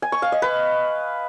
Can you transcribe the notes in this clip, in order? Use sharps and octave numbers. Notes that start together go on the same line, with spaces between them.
G#5
C#6
F5
D#5
B4